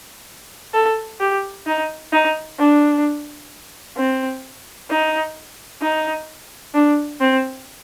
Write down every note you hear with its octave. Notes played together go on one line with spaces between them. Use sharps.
A4
G4
D#4
D#4
D4
C4
D#4
D#4
D4
C4